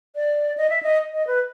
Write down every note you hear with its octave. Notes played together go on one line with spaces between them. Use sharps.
D5
D#5
E5
D#5
D#5
B4